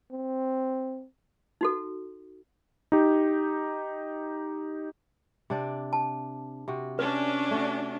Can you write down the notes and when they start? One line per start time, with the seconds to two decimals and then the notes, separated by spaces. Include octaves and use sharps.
0.11 C4
1.61 D#4 F#4 A4
2.92 D#4 G4
5.50 C3 D4 D5
5.93 A5
6.68 C3 F#4
6.99 C#4 D4 B4
7.51 A3 F#4